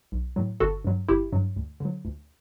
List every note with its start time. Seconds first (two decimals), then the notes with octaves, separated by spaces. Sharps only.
0.12 B1
0.36 A2 F#3
0.60 G1 F#4 A4
0.85 G2 F#3
1.09 G1 E4 G4
1.32 G2 F#3
1.56 D2
1.80 D3 F#3
2.05 D2